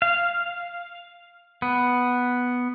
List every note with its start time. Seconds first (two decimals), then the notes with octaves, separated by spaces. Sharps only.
0.02 F5
1.62 B3